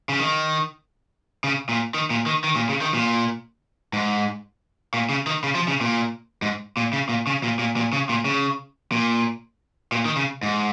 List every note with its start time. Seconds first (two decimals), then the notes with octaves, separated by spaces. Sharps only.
0.09 C#3
0.19 D#3
1.44 C#3
1.69 A#2
1.94 D#3
2.10 A#2
2.26 D#3
2.44 D#3
2.56 A#2
2.69 C#3
2.81 D#3
2.94 A#2
3.93 G#2
4.94 A#2
5.09 C#3
5.27 D#3
5.44 C#3
5.55 F3
5.68 C#3
5.81 A#2
6.42 G#2
6.77 A#2
6.93 C#3
7.09 A#2
7.27 C#3
7.43 A#2
7.59 A#2
7.76 A#2
7.93 C#3
8.09 A#2
8.25 C#3
8.92 A#2
9.92 A#2
10.05 D#3
10.17 C#3
10.43 G#2